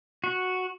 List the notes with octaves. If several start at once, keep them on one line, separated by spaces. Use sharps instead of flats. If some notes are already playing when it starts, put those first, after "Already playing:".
F#4